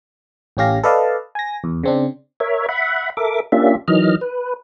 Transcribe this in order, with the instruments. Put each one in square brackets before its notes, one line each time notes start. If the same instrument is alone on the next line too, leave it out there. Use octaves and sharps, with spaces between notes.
[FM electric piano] A1 A2 C#4 G4 F5 A#6
A4 B4 D5 D#5 F5 A5
G#5 A#6
E2
C#3 C4 D4
[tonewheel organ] A#4 C#5 E5
E5 F#5 B5
A4 A#4 E5 D6
A#3 C#4 D4 F4 G4 E5
D#3 E3 F#3 D#5 F6
B4